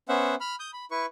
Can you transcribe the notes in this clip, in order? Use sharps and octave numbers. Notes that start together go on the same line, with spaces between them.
B3 C#4 C5 E5 F#5
B5 F6
D#6 G6
B5
E4 B4 C#6